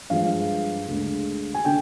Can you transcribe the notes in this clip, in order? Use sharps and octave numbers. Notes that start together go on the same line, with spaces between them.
G2 F3 G#3 F5
D2 D3 G#3
G#5
D3 G5